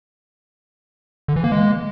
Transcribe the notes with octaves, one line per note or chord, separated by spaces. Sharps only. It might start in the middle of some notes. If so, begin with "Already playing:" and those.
D3
E3
A#3
G#3